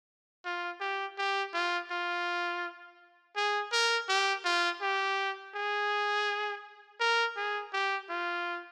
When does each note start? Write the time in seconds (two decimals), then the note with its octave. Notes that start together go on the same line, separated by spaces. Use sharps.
0.45 F4
0.80 G4
1.18 G4
1.53 F4
1.91 F4
3.36 G#4
3.72 A#4
4.09 G4
4.45 F4
4.81 G4
5.55 G#4
7.00 A#4
7.37 G#4
7.73 G4
8.10 F4